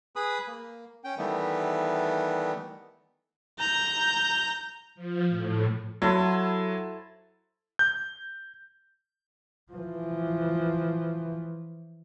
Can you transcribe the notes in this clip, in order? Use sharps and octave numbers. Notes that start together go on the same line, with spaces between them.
G#4 B4 B5 D#6
A#3
C#4 G5
D#3 E3 G3 A3 B3
A#5 G6
F3
A2
F#3 E4 A4 C5
G6
E3 F3